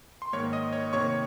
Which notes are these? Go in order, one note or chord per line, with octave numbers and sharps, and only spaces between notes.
C6
G#2 D#3 A#3 C#5 C#6
D#5 D#6
C#5 C#6
C3 D#3 A#3 C#5 C#6